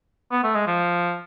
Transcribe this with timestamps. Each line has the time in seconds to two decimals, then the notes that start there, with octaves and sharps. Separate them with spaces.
0.32 B3
0.44 A3
0.55 G#3
0.67 F3